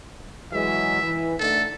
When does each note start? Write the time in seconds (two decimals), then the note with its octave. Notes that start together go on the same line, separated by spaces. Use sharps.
0.53 E3 F#3 G#3 E5
1.02 E3
1.39 D3 D#3 A3 A4